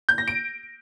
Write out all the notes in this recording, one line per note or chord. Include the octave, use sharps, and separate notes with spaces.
G6
A#6
D7